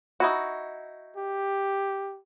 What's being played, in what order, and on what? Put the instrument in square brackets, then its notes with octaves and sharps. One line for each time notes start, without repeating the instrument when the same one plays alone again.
[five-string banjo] D#4 E4 F#4
[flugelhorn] G4